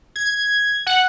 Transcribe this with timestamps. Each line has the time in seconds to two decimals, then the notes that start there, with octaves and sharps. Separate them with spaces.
0.16 G#6
0.86 F#5